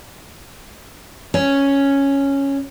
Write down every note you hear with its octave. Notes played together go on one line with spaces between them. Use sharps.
C#4